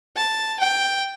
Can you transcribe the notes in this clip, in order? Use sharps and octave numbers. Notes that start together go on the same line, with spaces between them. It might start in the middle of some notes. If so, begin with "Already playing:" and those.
A5
G5